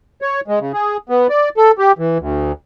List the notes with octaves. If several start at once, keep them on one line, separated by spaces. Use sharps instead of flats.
C#5
G#3
C#3
G#4
B3
D5
A4
G4
E3
D2